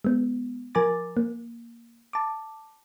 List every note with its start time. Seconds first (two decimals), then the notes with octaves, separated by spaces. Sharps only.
0.05 G#3 B3
0.75 F3 A#4 G#5 A#5 D6 A6
1.17 A#3
2.13 A5 D6